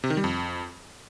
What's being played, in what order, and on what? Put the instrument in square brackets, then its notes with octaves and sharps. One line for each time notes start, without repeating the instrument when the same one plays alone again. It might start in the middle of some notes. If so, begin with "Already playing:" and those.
[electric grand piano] C3
D#3
G3
F2